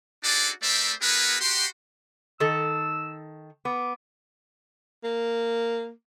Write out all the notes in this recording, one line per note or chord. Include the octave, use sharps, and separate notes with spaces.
D4 D#4 F#4 G#4 A4 D5
A3 C4 A#4 C5 D5 E5
B3 E4 F#4 G#4 A#4 B4
F#4 G4 C6
D#3 A4 E6
B3 D6
A#3